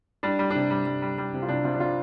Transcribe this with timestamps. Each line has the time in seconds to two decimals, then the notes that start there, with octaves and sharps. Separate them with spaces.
0.23 G3 D4
0.39 G3
0.50 D4
0.56 C3
0.71 G3
0.86 G3
1.02 G3
1.18 G3
1.34 C3
1.43 F4
1.48 C3 D4
1.64 C3 F4
1.74 D4
1.80 C3 F4